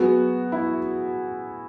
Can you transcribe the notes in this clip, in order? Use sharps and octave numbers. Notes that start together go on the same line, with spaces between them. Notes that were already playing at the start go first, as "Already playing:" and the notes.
Already playing: F#3 B3 F#4 G#4
E4